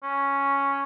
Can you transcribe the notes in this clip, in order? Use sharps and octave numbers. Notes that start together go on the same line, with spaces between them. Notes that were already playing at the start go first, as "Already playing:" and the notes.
C#4